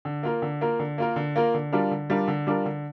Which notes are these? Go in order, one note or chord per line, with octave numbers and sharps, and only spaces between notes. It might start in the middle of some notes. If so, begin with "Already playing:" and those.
D3
A#3 F4 A#4
D3
A#3 F4 A#4
D3
A#3 F4 A#4
D3
A#3 F4 A#4
D3
G3 D4 F4 A#4
D3
G3 D4 F4 A#4
D3
G3 D4 F4 A#4
D3